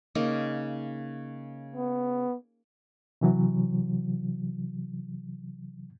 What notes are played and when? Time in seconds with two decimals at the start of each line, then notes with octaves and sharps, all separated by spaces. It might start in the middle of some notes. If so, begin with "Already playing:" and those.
0.15 C#3 A#3 D#4
1.76 B3
3.21 C3 E3 F#3